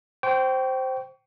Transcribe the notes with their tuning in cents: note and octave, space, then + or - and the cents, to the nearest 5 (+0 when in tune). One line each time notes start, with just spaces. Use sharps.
C5 +0 G5 -20 C#6 +30